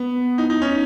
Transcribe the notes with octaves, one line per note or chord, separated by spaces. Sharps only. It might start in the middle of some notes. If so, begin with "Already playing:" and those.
Already playing: B3
D#4
D#4
C#4